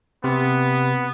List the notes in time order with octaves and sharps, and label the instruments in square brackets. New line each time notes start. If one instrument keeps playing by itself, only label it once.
[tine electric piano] C3 [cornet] B3